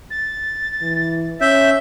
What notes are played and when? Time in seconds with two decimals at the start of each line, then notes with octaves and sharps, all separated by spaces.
0.11 A6
0.82 E3
1.41 C#4 E5 G6